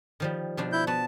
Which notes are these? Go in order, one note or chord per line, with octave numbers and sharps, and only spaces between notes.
D#3 F3 G3
B2 F3 D4
E4 G6
B3 F#4 A5